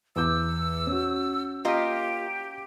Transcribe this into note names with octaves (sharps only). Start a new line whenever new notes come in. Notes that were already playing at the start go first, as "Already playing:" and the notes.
E2 D6 E6 G6
C#4 F#4
A#3 F4 G4 D#5